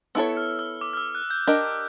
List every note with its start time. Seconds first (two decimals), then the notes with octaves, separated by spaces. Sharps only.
0.15 B3 E4 A4 C#5 E6
0.37 F6
0.59 E6
0.81 D6
0.93 F6
0.97 E6
1.15 F#6
1.31 G6
1.47 D4 G4 A#4 D#5 G6